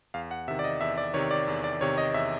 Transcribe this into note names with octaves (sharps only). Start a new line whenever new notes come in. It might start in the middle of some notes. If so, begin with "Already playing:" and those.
E2 F5
F#5
C3 D#3 E5
D5
D#5
E2 E5
D5
C3 D#3 C#5
D5
E2
D5
C3 D#3 C#5
D#5
E2 E5